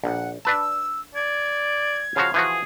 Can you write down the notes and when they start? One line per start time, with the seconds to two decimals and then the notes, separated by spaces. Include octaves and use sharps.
0.04 A#1 F#5
0.45 D4 B4 A5 E6
1.15 D5 G#6
2.16 C#3 F3 F#4 F5
2.34 E3 F3 F#4 G#4